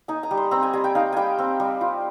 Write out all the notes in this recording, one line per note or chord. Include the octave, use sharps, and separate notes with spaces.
D#4 G#5
A#5
G3
C6
C4 A#5
G#5
G3 G#5
G5
D#4 F5
G3 G5 G#5
C4
G3
F4